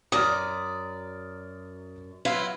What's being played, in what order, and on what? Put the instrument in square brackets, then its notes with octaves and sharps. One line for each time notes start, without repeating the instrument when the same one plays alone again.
[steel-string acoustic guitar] F#2 D5 A#5 [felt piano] D#6 F6
[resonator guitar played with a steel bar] F#3 B4 F5 [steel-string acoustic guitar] E4 F4